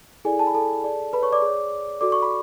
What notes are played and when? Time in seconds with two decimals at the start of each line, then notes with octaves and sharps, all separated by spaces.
0.25 E4 G#4 A4 D5 G#5
0.39 A5
0.47 B5
0.55 A4 A5
0.84 G#4 D5
1.13 B4 B5
1.22 C#5 C#6
1.32 D5 D6
1.42 G#4 C#5
2.01 F#4 A4 D5 D6
2.12 C#6
2.22 B5